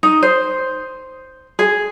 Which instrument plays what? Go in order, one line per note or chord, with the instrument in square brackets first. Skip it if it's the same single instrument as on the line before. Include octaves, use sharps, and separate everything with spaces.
[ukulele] D#4
C5
G#4